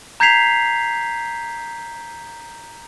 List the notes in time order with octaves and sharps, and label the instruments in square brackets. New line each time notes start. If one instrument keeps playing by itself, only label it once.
[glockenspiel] A#5 G6 G#6 B6 C7 F7